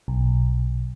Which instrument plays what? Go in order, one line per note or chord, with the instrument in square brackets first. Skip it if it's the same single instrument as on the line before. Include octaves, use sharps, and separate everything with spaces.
[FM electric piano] B1